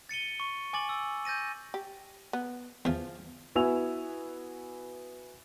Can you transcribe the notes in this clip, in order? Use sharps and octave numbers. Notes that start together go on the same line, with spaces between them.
A6 C#7 D#7 G7
C#6
G#5 D6 A6 F#7
E6
G6 A6 A#6 D#7
G4
B3
E2 E3 F3
B3 E4 F#4 G#5 E6 F7